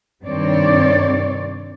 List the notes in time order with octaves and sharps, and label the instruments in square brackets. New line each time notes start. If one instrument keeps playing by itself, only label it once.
[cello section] G2 C3 D#3 C4 C#5 D5